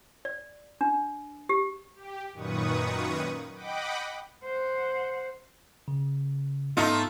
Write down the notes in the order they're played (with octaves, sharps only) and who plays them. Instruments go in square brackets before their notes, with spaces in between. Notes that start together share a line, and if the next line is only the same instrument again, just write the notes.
[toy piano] D5
D4
G4
[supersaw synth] G4
F#2 A#2 D#3 B4 C#6 D#6
D#5 F#5 G5 B5 D6
[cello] C5 F#5
[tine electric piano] C#3
[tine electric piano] G#2 B3 [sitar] A3 D#4 F4